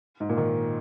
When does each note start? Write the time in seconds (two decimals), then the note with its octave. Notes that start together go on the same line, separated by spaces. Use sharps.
0.20 G#2
0.29 A#2
0.37 D#3